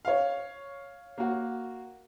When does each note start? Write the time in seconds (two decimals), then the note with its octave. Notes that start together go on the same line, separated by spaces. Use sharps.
0.05 C#5 F5
1.18 A#3 F#4